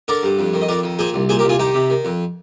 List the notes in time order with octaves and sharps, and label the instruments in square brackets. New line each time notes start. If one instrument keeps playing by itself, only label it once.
[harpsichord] D3 A#4 D5
G2
F2
D#3
D#5
F2 A#4 D5
D#3
A#2 G#4 C5
C2
A#2 G#4 C5
G4 A#4
C2
F4 G#4
D#3 D#4 G4
C3
D#3
F2